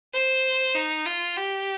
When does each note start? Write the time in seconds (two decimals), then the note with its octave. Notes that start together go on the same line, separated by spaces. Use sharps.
0.13 C5
0.75 D#4
1.06 F4
1.36 G4